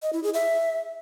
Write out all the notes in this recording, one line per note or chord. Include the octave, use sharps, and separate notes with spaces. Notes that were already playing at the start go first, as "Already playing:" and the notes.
D#5
E4
G#4
E5